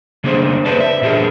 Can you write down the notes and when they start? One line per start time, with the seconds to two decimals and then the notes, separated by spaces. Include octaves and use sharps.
0.24 C#3 A#3 D4 G#4 C5
0.66 B4 C5 D5 A5
0.80 E5
1.02 A#2 D4 G4 G#4 A#4